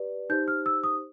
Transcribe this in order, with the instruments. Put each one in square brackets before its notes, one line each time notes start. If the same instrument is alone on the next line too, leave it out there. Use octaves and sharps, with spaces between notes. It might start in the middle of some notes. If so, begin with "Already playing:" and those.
Already playing: [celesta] G4 B4 D5
D#4 G4 C5 G6
F6
E6
D#6